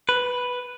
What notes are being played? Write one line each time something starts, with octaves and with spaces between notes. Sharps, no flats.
B4